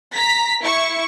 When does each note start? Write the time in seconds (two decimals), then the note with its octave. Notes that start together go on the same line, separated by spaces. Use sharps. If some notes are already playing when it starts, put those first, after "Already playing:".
0.14 A#5 B6
0.61 E4 C#6